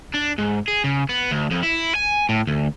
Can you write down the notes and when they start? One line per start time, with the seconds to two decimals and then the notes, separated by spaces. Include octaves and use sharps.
0.14 D4
0.38 G#2
0.68 G#4
0.84 C#3
1.09 B3
1.31 D2
1.51 F2
1.63 E4
1.95 G#5
2.29 A2
2.47 D2